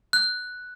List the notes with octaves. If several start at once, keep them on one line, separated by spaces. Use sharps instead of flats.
F#6